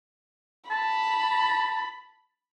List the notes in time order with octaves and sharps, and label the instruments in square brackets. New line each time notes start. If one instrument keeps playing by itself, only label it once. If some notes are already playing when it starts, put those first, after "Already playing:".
[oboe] A5 [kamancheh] B5